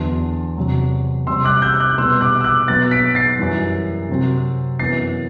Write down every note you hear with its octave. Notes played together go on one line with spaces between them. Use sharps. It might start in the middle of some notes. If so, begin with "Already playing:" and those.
Already playing: E2 D3 F#3 B3 A5 C6
E2 C3 F#3
C3 G3 C4 C6 E6
D6 F#6
E6 G6
D6 F#6
B2 G3 B3 C6 E6
D6 F#6
E6
D6 F#6
B2 F#3 B3 F#6 A6
B6 D7
A6 C7
F#2 E3 G3
C3 F#3 C4
F#2 E3 B3 A6 C7